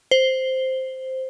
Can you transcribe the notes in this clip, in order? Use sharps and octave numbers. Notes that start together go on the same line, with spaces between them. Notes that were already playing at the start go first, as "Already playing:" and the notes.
C5